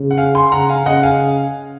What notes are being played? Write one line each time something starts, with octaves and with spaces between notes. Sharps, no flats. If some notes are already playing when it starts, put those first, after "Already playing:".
Already playing: C#3
F#5
F5 G#5
G#5 C6
C#3 F#5 A#5
F5 G#5
C#3 D#5 F#5
F5 G#5